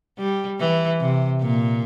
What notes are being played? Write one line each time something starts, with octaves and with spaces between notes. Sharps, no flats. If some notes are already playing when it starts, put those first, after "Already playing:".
G3
E3
C3
A#2